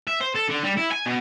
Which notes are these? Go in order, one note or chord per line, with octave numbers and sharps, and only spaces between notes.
E5
C5
A4
D3
G3
E4
G#5
B2